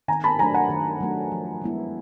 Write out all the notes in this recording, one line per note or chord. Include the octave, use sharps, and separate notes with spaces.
D#3 G#5 A#5
A5 B5
F#3 A3 D4 G#5 A#5
F#5 G#5
D#3
F#3 A3 D4
F3
G#3 B3 E4